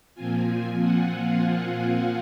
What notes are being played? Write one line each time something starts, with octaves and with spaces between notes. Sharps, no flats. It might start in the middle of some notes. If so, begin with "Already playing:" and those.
A#2 F3 C4 F4 G#5
F#5
F5